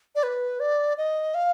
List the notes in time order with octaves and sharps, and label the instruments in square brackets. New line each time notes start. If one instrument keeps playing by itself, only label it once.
[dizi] D5
B4
D5
D#5
F5